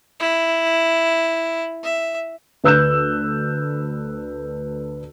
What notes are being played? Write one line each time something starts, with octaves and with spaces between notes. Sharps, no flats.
E4
E5
D2 B4 E6 F#6 G6 E7